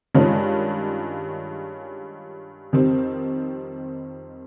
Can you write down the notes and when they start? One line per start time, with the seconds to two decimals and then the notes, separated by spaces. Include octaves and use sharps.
0.14 G2 D#3 G#3 C#4 F4
2.73 F2 D#3 G3 C4